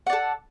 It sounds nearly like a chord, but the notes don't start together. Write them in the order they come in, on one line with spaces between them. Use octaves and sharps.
F#5 D5 A4